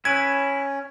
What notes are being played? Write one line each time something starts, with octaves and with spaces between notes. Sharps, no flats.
C#4 E4 B4 G#6